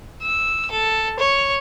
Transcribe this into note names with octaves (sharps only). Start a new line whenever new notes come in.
E6
A4
C#5